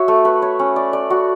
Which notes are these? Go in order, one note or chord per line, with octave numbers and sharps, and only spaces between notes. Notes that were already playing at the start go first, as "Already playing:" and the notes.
Already playing: F#4 C#5 E5
A3
B4
C#5
C#4
D5
D5
F#4